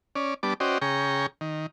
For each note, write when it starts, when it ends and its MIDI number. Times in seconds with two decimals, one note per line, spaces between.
0.16 0.34 61
0.16 0.34 74
0.43 0.54 55
0.43 0.54 59
0.43 0.54 62
0.43 0.54 81
0.43 0.54 86
0.60 0.78 61
0.60 0.78 66
0.60 0.78 72
0.60 0.78 74
0.60 0.78 75
0.60 0.78 79
0.82 1.26 49
0.82 1.26 68
0.82 1.26 79
0.82 1.26 82
0.82 1.26 85
1.41 1.66 51